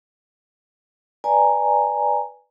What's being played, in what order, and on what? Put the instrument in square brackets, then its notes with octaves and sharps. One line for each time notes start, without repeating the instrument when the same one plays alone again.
[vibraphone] B4 D5 G5 G#5 A#5